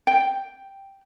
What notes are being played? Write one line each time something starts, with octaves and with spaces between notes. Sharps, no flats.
G5